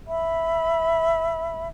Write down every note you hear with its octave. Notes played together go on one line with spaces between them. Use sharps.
E5 B5